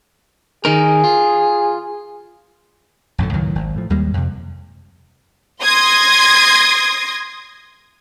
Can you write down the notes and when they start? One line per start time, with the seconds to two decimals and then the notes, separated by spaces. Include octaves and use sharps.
0.65 D#3 D#4 G#4 A#4
1.04 F4
3.18 A1 F#2 A#2 D3
3.33 C#2 A2 D#3 F#3
3.55 G#1
3.76 A2 F3
3.90 D#2 G3 G#3 A#3
4.14 F2 C3
5.62 C6 D#6 G#6 A#6